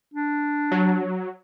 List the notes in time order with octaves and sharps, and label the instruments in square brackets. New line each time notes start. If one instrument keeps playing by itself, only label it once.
[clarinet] D4
[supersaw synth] F#3